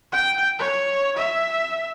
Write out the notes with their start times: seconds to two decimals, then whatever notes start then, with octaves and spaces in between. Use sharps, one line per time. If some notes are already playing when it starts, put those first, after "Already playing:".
0.12 G5
0.58 C#5
1.17 E5